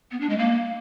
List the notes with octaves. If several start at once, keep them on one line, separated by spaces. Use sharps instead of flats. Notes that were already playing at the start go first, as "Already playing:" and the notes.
B3
D4
G#3
A#3